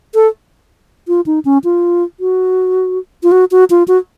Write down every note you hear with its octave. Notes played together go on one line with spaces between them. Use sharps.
A4
F4
D#4
C#4
F4
F#4
F4
F#4
F#4
F4
F#4